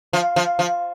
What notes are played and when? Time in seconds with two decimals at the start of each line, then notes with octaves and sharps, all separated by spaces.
0.13 F3
0.36 F3
0.59 F3